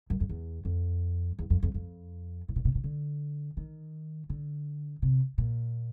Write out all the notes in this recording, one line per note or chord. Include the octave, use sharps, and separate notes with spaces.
F#2
F2
E2
F2
E2
F2
F2
F2
A2
A#2
B2
B2
D3
D#3
D3
C3
A#2